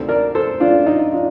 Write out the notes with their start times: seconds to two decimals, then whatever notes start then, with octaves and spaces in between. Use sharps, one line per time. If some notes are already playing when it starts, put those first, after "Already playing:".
Already playing: D2 C3 D#3 A4 C5
0.09 A#4 D5
0.35 A4 C5
0.60 D4 F4
0.86 D#4
1.12 D4 F4